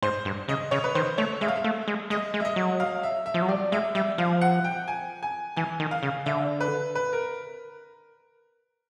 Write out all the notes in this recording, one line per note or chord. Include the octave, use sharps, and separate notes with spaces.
G#2 C5
G2
C#3 D#5
C#3 C#5
B4
D#3 C5
A3 C#5
G#3 E5
F5
E5
A3
G#3
G#3 D#5
G#3
E5
D#5
F#3
F5
E5
E5
F3
F#3
G3 D5
G#3 E5
G3 E5
F3 F5
F#5
G5
G#5
G#5
E3 G#5
D#3
F5
C#3
D3 E5
B4
B4
A#4